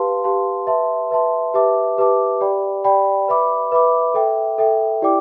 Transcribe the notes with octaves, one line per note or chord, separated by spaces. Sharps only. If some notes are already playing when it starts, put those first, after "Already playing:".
Already playing: G4 B4 F5 A5 C6
G4 B4 F5 A5 C6
B4 E5 A5 C6
B4 E5 A5 C6
G4 B4 E5 A5 D6
G4 B4 E5 A5 D6
G4 D5 G5 B5
G4 D5 G5 B5
B4 E5 B5 D6
B4 E5 B5 D6
A4 E5 G5
A4 E5 G5
E4 G4 D5 G5 D6